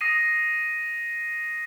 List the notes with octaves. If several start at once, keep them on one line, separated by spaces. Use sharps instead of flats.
D#6 A#6 C7 D#7